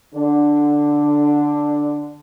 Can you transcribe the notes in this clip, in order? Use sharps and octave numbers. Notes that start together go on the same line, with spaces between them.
D3 D4